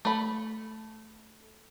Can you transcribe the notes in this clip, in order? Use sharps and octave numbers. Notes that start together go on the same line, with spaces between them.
A3 B5